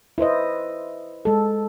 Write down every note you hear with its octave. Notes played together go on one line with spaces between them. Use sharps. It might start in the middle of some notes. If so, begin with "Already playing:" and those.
E4 B4 C5 D#5
G#3 A4